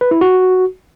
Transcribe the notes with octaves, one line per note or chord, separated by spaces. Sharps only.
B4
E4
F#4